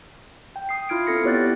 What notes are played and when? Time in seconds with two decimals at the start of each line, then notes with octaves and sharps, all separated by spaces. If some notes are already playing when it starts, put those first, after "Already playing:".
0.56 G5
0.69 D#6 C7
0.89 E4 F4 F6 G#6 D7
1.07 C4 E4 A4 A#6 C#7
1.24 B3 G4 C#5 D5 F#6 A6